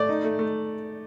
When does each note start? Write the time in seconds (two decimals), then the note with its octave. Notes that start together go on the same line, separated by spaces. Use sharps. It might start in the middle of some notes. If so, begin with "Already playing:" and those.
Already playing: A3 D5
0.09 D#4
0.24 A3
0.39 A3